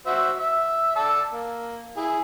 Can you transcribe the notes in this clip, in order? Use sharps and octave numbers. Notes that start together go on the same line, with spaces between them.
F#4 C5 E5
E5
D5 A5 E6
A#3
E4 G#4